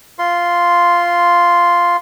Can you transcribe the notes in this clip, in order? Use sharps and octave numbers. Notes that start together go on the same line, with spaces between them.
F4 C6